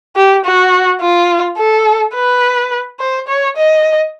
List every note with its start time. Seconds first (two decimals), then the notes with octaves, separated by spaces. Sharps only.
0.16 G4
0.45 F#4
1.01 F4
1.58 A4
2.14 B4
3.00 C5
3.28 C#5
3.56 D#5